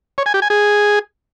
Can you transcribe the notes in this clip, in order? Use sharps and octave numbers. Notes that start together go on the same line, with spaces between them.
C#5
G#5
G4
G#5
G#4